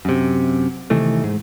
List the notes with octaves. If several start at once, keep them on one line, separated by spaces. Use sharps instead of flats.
F#2 C3
C3 D#3 E3 A3
G#2